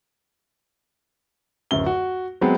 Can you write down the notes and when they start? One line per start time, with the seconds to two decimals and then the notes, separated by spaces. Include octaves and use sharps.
1.71 D1 F#2 G7
1.86 F#4
2.41 F#3 G#3 B3 C4